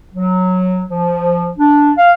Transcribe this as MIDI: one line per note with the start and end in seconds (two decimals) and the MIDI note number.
0.14 0.82 54
0.90 1.49 53
1.58 1.92 62
1.98 2.12 77